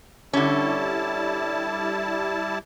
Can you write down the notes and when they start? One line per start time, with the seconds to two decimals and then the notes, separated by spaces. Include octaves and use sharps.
0.33 D3 G3 C#4 E4 A5